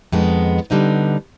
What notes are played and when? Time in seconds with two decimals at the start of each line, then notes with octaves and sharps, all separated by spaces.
0.12 F2 D#3 G#3 B3
0.70 D3 G3 B3 D#4